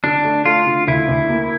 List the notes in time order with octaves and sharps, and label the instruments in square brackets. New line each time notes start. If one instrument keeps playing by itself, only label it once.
[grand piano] D3 [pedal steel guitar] D4
[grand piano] A3
[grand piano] A3 [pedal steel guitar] F4
[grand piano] D3
[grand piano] D2 [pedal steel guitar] E4
[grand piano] D2
A#3